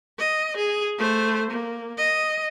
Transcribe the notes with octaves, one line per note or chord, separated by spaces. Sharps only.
D#5
G#4
A3 C5
A#3
D#5